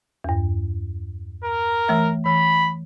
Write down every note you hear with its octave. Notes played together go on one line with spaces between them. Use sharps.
E2 G2
A#4
E3 A3 E5
E3 B5